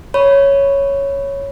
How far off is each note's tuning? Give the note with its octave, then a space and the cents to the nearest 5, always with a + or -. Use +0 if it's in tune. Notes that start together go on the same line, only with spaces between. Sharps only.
C#5 +0 B5 +0